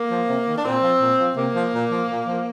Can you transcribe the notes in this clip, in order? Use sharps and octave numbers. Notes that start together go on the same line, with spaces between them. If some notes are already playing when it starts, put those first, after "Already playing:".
Already playing: A#3
F3
C3
D#3
D4
A#2 C4
F3
A#2
F3
C3 A#3
F3
A#2
F3
A#2
F3